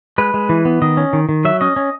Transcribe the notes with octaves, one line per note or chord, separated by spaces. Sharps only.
G#3 B4
G#3
E3
B3
D#3 D#5
C#4
D#3
D#3
F#3 E5
C#4 D#5
C#4